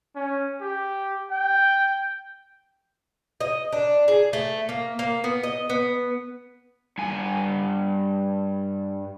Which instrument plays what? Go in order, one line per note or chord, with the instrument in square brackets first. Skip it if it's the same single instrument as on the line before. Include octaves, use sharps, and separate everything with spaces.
[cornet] C#4
G4
G5
[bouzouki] D#5
D4
G#4
A3
A#3
A#3
B3
D#5
B3
[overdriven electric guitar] G2 G#5